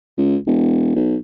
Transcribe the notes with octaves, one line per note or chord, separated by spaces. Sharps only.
C#2
E1
B1